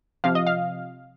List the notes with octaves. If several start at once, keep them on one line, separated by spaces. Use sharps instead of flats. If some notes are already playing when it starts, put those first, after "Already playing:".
C3 F3 F5
D#5
F5